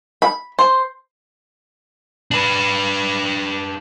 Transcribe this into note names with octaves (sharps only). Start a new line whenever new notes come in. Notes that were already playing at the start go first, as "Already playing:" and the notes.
B5
C5
D4 B4